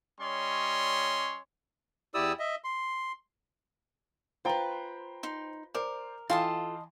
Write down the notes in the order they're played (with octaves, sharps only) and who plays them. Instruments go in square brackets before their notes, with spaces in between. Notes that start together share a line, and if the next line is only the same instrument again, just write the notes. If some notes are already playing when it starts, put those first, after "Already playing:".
[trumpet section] G3 C#4 C#5 D#5 C6
[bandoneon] E2 E4 G4 D5 D#6 E6
D#5 E5
C6
[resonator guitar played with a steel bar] F4 B4 [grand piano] C5 G5 A#5
[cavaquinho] D#4 C6
[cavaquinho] A#4 [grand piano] C5 D5 D6
[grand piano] E3 F5 G5 [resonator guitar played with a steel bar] F4 A4 [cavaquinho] D#5 A5 C6